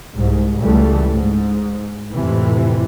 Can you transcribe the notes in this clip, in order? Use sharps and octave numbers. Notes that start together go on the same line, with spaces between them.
C2 G#2
C#2 C#3 E3 G3 A3
G#2
F2 A2 C3 E3